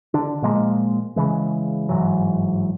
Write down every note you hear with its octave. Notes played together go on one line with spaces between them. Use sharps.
D3 D4
A#2 F3 G#3 A#3
C#3 E3 G#3
G1 G#2 E3 F#3